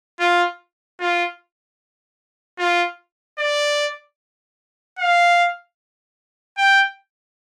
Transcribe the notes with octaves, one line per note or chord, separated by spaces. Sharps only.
F4
F4
F4
D5
F5
G5